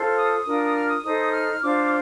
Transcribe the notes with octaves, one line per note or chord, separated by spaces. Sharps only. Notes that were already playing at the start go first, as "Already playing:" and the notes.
Already playing: F4 A4 C5
D#6
D4 F4 A#4
D#6
F6
D#6
D#4 A4 C5 D#6
F6
D4 F4 C5 D6